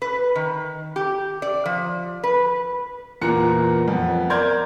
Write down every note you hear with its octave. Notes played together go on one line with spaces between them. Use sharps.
B4
D#3
G4
D5
F3
B4
E2 A#2 A#5 F#6 C#7
F2 B3
A#4 D5 C6 F6 G6 G#6